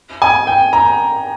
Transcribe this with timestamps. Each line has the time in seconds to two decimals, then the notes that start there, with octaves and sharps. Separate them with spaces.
0.22 G#5
0.47 G5
0.73 A#5